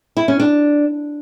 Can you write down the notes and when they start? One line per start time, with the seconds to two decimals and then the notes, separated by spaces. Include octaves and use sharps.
0.17 E4
0.28 C#4
0.40 D4